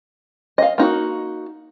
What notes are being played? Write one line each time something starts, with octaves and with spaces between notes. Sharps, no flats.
D#5 F5
A#3 D#4 F#4